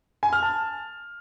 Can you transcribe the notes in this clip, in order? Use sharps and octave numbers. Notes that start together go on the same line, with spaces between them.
G#5
F6
A5